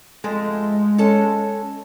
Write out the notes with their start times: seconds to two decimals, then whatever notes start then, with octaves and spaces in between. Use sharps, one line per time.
0.24 F2 G#3 A3
0.98 C#4 A4 A5